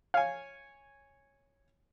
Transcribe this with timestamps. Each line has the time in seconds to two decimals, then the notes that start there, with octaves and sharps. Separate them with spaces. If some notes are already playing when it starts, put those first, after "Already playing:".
0.14 C#5 F5 G#5